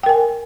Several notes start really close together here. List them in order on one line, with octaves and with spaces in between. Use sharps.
G5 A#4 G#5